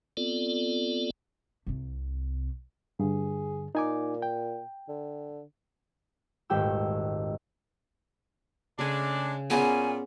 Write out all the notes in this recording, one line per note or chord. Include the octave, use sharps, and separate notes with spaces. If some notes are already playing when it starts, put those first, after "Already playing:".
B3 C4 F4 A4 D5
C2 C3
G2 D3 G#4
A#2 D#4 G#5 D6
G5
D3
D#1 G#1 A3 G4 G5 E6
C#3 G#3 A3 D4 G#5
A#2 B3 C#4 G#4 G#5